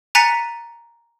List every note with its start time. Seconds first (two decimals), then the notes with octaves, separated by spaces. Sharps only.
0.15 G#5 A#5 F#6 A6 B6 C#7